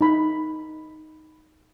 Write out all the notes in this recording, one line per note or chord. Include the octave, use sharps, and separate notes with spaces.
D#4 B5